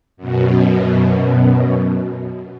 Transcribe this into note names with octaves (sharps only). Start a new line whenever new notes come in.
F#2 B2